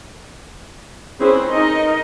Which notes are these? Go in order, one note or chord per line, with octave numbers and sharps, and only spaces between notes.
C4 C#4 E4 G#4 B4 C5
D#4 A#4 D#5